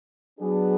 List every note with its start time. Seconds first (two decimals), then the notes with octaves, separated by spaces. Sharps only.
0.39 F#3 B3 D4 G#4